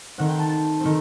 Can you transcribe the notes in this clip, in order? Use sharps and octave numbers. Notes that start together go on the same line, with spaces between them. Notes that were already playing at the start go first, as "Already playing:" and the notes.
D#3 A3 C4 F#5
G5
A5
A5
D#3 A3 C4